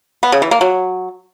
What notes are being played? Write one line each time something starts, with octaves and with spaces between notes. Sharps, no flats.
B3
C#3
E3
A#3
F#3